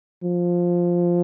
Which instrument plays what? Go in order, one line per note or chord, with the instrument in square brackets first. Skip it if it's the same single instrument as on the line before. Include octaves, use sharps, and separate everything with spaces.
[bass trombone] F3